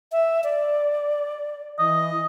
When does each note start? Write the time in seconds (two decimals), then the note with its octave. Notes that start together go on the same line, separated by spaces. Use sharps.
0.12 E5
0.44 D5
1.79 E3 D#5